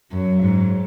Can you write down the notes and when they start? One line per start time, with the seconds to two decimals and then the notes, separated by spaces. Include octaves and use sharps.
0.11 F#2 F#3
0.42 G#2